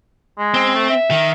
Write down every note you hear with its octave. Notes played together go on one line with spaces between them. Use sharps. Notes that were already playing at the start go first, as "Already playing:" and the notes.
G#3
C4
A3
E5
D#3